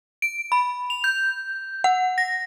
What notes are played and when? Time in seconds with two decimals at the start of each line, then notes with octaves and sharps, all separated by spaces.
0.22 D7
0.52 B5
0.90 F7
1.04 G6
1.84 F#5
2.18 A#6